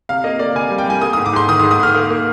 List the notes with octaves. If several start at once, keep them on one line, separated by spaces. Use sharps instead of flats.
C3 F5
A#3 D#5
A#3 D5
C3 G#5
G3
G5
G3 G#5
A#3 D#6
G#2 D#6
D6
G#2 C6
D#3 D#6
D#6
G#2
D#6
G#2 F6
A#3
A#3